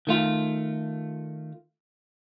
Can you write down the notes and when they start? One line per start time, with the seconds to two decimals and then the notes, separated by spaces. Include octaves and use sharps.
0.07 D#3 A3 F4